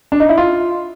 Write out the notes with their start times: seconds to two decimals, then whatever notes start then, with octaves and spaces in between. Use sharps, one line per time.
0.12 D4
0.20 D#4
0.29 E4
0.38 F4